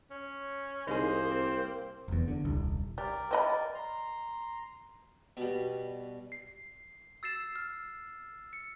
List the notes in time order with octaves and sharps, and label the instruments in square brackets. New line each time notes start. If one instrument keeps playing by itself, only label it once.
[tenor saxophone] C#4
[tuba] C2 [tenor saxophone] A#3 [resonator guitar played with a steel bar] D#4 G#4 [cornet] C5
[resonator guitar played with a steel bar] C4
[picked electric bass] F1 E2
D3
D#1 C2
[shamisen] G3 [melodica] A#4 D5
[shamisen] C4 D#5 B5
[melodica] A#5 C6
[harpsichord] B2 G3
[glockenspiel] C7
E6 A6 C7 E7
F6
C#7